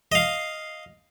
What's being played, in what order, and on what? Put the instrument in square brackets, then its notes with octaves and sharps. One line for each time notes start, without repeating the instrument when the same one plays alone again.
[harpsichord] D#5 F5